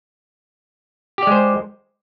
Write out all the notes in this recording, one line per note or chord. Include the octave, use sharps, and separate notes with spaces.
G#3 G4 C5 D5